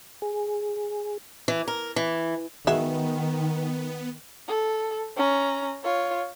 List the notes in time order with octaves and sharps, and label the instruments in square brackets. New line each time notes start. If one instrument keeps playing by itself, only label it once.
[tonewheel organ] G#4
[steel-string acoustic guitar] E3
A#4
E3
[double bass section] D#3 [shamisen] G#3 F#4 E5 [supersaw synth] B3
[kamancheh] A4
C#4 A#5
F4 C#5